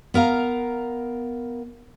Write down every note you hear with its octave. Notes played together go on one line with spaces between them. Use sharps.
B3 A#4 F5 A#5